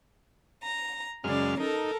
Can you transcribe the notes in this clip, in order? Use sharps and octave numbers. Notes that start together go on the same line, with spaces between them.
A#5
F#2 C#3 G#3 D5 F6
D#4 A4 A#4